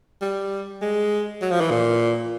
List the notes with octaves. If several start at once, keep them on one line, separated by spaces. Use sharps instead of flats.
G3
G#3
F#3
F3
E3
A#2